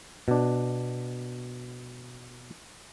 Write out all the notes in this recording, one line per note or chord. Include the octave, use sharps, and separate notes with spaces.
B2 D4